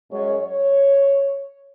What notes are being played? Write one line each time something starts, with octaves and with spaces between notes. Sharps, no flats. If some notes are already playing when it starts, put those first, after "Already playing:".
F#2 G#3 C#5
C#5